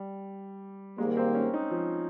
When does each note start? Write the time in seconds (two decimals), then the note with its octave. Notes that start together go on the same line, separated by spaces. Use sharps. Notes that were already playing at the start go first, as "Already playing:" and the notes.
Already playing: G3
0.98 G#2 D#3 G3 G#3 A#3
1.17 C4
1.34 C#4
1.54 D#4
1.71 F3